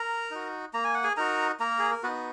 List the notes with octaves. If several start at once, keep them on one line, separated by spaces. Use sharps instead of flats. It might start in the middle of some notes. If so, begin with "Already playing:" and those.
Already playing: A#4 A#5
D#4 F#4
A#3 A#5
G#5
F#5
G#4 G#5
D#4 F#4 A#4 A#5
A#3 A#4 A#5
G#4
A#4
B3 D#4 F#4 B4